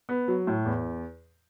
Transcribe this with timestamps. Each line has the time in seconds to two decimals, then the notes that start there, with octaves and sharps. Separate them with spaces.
0.09 B3
0.28 F#3
0.47 A2
0.65 E2